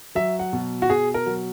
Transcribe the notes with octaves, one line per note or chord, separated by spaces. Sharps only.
F#3 E5
F#5
B2
F#4
B2 G#4
A#4
F#3